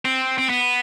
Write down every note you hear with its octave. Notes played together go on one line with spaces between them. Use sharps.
C4
C4
B3